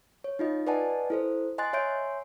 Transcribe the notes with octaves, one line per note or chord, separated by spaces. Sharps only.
C#5
D#4 F4 D#5
B4 D5 D#5 F#5 G#5 A5
E4 A4 C5
D#5 G#5 C6 F#6 A6
C#5 E5 G#5 C6 G6 D7